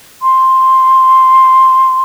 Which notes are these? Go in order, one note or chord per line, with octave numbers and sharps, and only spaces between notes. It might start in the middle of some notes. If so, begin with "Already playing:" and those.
C6